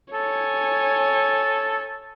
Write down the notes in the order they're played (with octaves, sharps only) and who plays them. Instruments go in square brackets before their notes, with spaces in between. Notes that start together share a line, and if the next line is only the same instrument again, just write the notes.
[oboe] A4 [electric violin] C#5 G#5